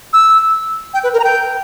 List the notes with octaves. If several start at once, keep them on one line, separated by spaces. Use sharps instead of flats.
E6
G5
B4
A#4
A#5
G5